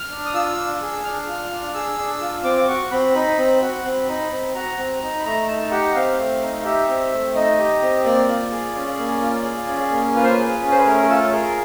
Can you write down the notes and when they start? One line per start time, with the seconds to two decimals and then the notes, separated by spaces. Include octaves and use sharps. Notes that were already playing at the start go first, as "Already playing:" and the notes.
Already playing: F6
0.10 D4
0.26 D#6
0.34 F4 E6
0.57 D4
0.82 G#4
1.04 D4 F6
1.27 F4
1.51 D4
1.74 G#4 E6
1.98 D4
2.21 F4
2.44 C4 D6
2.57 D6
2.68 F#4 C#6
2.91 C4 B5
3.14 D#4 B5
3.38 C4
3.62 F#4
3.85 C4
4.08 D#4
4.31 C4
4.55 F#4 A#5
4.78 C4
5.02 D#4
5.20 B5
5.25 A3 A#5
5.48 D#4 A5
5.71 G4 F#5
5.95 C4 F5
6.18 A3
6.42 D#4
6.64 G4 E5
6.89 C4
7.12 A3
7.35 D#4 D#5
7.59 G4
7.82 C4
8.04 A#3 D5
8.29 F4
8.52 G#4
8.76 C#4
8.98 A#3
9.21 F4
9.44 G#4
9.68 C#4
9.91 A#3
10.14 F4 B4
10.23 C5
10.32 B4
10.38 G#4
10.62 C#4
10.71 C5
10.79 B4
10.85 A3 A#4
11.09 F4 A4
11.32 G#4 A#4